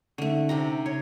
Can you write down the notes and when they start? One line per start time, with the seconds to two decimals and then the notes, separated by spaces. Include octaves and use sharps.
0.18 D3 A3 C#4 D#4
0.49 C3 D4 D#4 G4 A#5
0.86 C#3 C#5